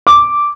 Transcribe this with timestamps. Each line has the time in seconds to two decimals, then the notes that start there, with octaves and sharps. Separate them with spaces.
0.07 D6